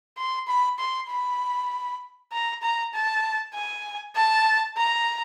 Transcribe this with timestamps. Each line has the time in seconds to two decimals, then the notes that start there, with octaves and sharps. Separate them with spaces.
0.18 C6
0.47 B5
0.79 C6
1.09 B5
2.32 A#5
2.62 A#5
2.94 A5
3.55 G#5
4.16 A5
4.77 A#5